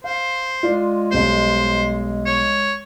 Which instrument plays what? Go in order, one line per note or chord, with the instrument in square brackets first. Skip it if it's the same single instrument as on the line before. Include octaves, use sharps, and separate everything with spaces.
[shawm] C5 [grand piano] F5
[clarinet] G#3 [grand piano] F4 D5
[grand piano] B1 G3 [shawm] C5
[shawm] C#5